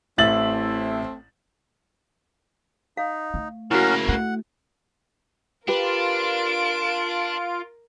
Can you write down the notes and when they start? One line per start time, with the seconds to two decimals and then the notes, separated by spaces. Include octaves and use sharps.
0.18 A1 A3 C4 E4 E5 A6 F#7
2.97 D#4 F5
3.34 A3
3.71 C#3 A#3 C#4 E4 F#4 A#4 F#5
4.09 A3 F#5
5.68 D4 F4 G4 A#4 B4 D7